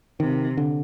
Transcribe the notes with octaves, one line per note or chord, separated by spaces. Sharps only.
C3 D#3
D3